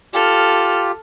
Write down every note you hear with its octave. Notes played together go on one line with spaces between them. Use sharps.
F4 G4 A4 F6